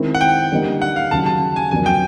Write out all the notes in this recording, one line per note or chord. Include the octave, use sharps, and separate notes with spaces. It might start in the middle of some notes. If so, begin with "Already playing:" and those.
Already playing: D#3 G#3 C4 E4
F#5
G5
D3 G3 A#3 D#4
F#5
F5
D#2 C#3 F#3 A5
A5
G#5
F2 D3 F#3 A#3 D4 G#5
G5